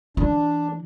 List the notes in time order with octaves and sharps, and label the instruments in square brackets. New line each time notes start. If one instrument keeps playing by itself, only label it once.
[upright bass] E3 [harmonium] D4